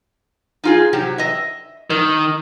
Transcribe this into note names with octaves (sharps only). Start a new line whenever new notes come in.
D#4 F4 G#4
C3 F#3 G4
D#5 E5
D#3 A#4